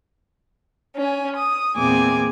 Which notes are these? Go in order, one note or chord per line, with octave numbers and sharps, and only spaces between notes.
C#4 G#5
D#6
E2 A#2 C4 G#5 D6